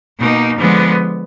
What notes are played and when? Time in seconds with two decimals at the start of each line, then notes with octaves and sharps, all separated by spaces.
0.19 B2 A#3 D#4
0.59 D3 F3 G#3 B3